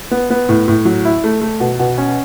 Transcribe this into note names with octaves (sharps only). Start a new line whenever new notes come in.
B3
B3
A2
A2
F#3
E4
A3
A3
B2
B2
C#4